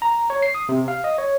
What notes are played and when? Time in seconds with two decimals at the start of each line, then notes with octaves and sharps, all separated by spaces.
0.02 A#5
0.30 C#5
0.42 C7
0.55 D#6
0.69 C3
0.88 F5
1.04 D#5
1.18 C#5